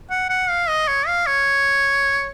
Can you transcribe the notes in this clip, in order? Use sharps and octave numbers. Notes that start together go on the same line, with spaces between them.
F#5
F#5
F5
D#5
C#5
F5
C#5